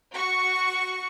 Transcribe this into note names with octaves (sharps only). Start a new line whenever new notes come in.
F#4 C#6